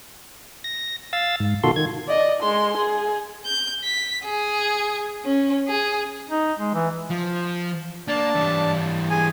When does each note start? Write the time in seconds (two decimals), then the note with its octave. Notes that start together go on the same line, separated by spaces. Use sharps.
0.64 A#6
1.13 F5 E6 A6
1.40 G#2
1.64 B2 D#3 F4 F#4 A4 C6
1.76 D#3 G#6
2.07 D5 D#5
2.42 G#3 C6
2.77 G#4
3.45 G6
3.84 B6
4.25 G#4
5.24 C#4
5.69 G#4
6.30 D#4
6.59 G#3
6.74 E3
7.11 F3
8.08 A#3 D4 A5
8.35 E3 G3
9.10 G#4 G#5